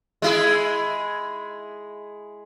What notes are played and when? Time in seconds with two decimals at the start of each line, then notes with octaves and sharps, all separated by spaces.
0.22 G#3 E4 G#4